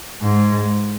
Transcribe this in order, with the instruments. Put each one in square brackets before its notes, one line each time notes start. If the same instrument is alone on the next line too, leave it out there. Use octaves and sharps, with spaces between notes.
[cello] G#2